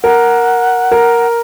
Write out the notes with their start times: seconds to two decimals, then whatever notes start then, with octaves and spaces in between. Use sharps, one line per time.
0.03 A#4 F#5
0.91 A#4